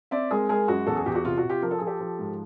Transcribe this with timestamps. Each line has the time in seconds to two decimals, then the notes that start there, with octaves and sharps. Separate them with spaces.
0.11 C4 D5 E5
0.30 G#3 G#4 A#4
0.49 G#3 G#4 A#4
0.68 F#2 F#4
0.87 E2 A4
0.96 G#4
1.06 E2 G4
1.15 F#4
1.25 C3 F4
1.38 F#4
1.44 C3
1.49 F4 G4
1.62 F3 A#4
1.71 A4
1.78 F3 G#4
1.87 G4 A4
2.00 F3
2.19 G#2